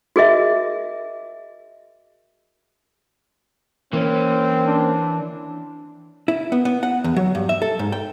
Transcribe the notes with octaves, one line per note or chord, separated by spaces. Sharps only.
F#4 G#4 A#4 D#5 E5
E3 A#3 C4 C#4
D4
E4
B3
B3
F#5
E2
F#3
G2
E5
A4
G#2
G5